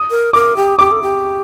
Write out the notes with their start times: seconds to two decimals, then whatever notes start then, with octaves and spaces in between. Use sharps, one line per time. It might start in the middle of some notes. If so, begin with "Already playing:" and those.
Already playing: D#6
0.11 A#4
0.33 A#4 D6
0.56 G4
0.79 G4 D6
0.91 A4
1.03 G4